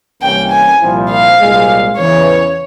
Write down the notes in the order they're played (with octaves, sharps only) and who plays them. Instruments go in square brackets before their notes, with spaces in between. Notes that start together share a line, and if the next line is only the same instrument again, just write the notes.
[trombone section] C2 C3 E3 A#3 C#4 [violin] G5
[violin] G#5
[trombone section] C2 A#2 F3 C4 E4
[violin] F5
[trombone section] C2 A#2 G#3
[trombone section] E2 C#3 E3 [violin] C#5